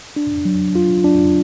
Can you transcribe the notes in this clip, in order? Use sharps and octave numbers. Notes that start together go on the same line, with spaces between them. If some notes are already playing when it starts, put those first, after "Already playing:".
D4
F#3
F4
D4